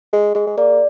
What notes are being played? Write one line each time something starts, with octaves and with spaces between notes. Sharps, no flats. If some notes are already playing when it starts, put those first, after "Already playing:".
G#3 G#4
G#3 G#4
G#3
A#3 D5